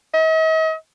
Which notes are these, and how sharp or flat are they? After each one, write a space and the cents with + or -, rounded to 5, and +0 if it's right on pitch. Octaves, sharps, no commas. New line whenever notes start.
D#5 +45